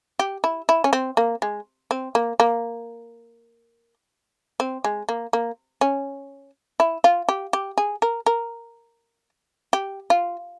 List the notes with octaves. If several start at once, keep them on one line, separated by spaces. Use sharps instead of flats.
G4
E4
E4
C#4
C4
A#3
G#3
C4
A#3
A#3
C4
G#3
A#3
A#3
C#4
E4
F4
G4
G4
G#4
A#4
A#4
G4
F4